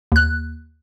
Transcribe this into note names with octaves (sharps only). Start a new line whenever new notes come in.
D#2 F#6